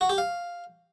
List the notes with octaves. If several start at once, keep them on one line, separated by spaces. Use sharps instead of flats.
F#4
G4
F5